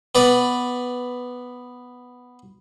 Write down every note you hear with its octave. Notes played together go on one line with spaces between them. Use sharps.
B3 B4 D5